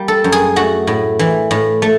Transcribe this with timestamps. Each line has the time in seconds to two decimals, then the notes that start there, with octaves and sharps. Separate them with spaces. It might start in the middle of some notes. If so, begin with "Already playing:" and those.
Already playing: G3 A#3
0.08 A4
0.24 F#2
0.32 G#4
0.56 A3 F#4
0.87 A2
1.19 E3
1.51 A2
1.82 A3